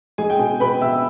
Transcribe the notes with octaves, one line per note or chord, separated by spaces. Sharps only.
G#3 G#4 G#5
G5
B2 G#4 G#5
B2 B4 B5
B2 E5 E6